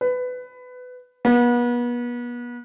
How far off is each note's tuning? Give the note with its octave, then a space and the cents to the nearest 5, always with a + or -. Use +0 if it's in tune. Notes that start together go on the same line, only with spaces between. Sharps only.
B4 +20
B3 -35